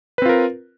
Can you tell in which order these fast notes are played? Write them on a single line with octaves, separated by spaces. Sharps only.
B4 C4 F4 A#4